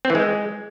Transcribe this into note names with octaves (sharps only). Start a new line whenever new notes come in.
C4
E3
G#3